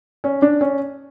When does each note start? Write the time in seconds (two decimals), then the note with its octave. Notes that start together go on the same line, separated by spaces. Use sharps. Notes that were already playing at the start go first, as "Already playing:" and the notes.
0.24 C#4
0.42 D4
0.61 C#4